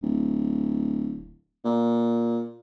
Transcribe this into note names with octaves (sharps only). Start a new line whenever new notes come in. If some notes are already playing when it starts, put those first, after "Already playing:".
D1
A#2